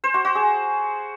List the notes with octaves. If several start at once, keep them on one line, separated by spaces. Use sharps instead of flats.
C5
F#4
F#4
G#4